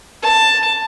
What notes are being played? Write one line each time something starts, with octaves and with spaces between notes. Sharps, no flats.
A5